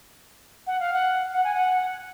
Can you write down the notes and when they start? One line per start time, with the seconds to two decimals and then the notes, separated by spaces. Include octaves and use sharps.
0.67 F#5
0.80 F5
0.93 F#5
1.33 F#5
1.44 G#5
1.54 F#5